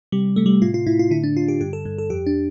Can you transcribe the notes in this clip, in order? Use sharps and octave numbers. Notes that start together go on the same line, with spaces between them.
C3 G3
C3 A3
G3
A2 F4
F4
A2 E4
F4
D3 E4
D4
D3 F4
G4
G2 G4
A4
G2
A4
F2 G4
D4